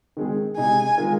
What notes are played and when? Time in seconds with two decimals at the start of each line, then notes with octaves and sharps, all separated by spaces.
0.17 D#3 G#3 C4 G#4
0.57 C3 G#3 D#4 G#5
0.98 D#3 G#3 F4 A#4